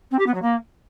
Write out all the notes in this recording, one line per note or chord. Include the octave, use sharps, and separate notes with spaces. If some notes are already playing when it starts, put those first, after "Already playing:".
C4
G4
B3
F#3
A#3